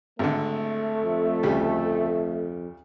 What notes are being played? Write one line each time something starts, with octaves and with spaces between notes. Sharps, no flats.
G#1 D3 A3
F2
D2 C#3 G3